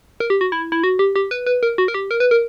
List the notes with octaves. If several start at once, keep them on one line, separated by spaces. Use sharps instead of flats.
A#4
G4
F#4
E4
E4
F#4
G4
G4
B4
B4
A#4
F#4
A#4
G4
A#4
B4
A#4